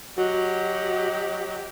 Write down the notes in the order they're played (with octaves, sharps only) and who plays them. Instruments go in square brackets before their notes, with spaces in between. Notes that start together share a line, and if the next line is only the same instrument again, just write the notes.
[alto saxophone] F#3 [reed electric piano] F#4 [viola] G4 [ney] D#5